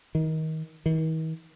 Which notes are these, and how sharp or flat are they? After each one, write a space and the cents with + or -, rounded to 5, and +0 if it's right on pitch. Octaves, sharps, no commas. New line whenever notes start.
D#3 +25
D#3 +45